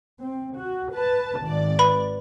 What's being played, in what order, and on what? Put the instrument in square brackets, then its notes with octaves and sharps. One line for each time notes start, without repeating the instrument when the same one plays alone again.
[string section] C4
F#4
B4 A5
G#1 D5
[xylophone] B4 B5